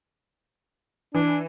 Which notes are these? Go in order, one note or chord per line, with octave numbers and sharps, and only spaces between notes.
E3 D4